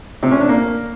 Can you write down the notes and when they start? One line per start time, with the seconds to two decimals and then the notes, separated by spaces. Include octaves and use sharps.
0.23 C3
0.31 C#4
0.40 D4
0.49 A#3